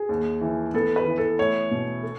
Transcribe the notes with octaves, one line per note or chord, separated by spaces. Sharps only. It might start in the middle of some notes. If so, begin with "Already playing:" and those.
Already playing: G#4
D#2
E3
B3 A4
B4
E3
A4
A3 C#5
B2
A4